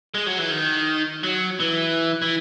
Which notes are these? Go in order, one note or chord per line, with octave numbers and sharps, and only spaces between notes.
G#3
F#3
E3
D#3
F#3
E3
E3